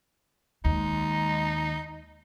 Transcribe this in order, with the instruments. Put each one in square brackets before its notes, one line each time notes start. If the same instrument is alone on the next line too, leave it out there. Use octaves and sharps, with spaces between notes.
[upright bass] D#2 [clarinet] G#3 [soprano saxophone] D#4